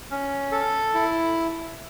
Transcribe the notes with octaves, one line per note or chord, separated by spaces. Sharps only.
C#4
A4
E4